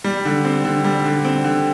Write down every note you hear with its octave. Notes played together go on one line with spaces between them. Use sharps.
G3
D3
C4
D3
G3
D3
C4
D3